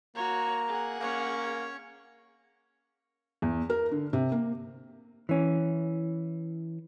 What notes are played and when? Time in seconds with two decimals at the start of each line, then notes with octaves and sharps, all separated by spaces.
0.16 A#3 F#4 C#5 A#5
0.68 G#4 F#5
1.00 A#3 C#4 C#5
3.42 E2
3.70 A#4
3.91 D3
4.13 C3
4.32 A#3
5.29 E3 C#4